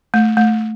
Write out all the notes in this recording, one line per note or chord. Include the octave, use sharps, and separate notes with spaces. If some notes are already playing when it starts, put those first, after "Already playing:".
A3
A3